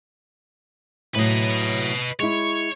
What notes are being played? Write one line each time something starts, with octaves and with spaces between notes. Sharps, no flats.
A2 F#3 B4 D#5
G#3 E4 C#5